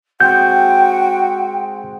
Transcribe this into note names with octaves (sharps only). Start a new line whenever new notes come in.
G#3 C4 F#4 G#4 G5 G6